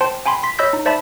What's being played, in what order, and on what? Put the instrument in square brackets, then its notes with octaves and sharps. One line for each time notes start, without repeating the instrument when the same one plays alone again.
[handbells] C5 G5 A5 C6
G5 G#5 B5 C6
C6 B6
C#5 D#5 B5 E6 G6 B6
D#4
C5 D5 E5 A5 B5